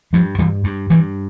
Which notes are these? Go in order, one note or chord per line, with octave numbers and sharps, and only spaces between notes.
G2 F3
G2 E3 G3
G2
G2 E3